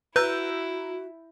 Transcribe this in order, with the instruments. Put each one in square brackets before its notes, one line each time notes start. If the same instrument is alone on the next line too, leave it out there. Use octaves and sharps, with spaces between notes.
[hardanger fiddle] E4 [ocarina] F#4 [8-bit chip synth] B4 [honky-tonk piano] A#5 E6 G6